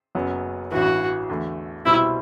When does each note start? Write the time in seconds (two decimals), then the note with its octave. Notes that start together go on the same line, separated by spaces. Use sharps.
0.15 F#1 F#2 F#3 B3
0.72 A1 G2 E3 F#4
1.29 E2 D3 A3
1.85 C2 B2 G3 C4 E4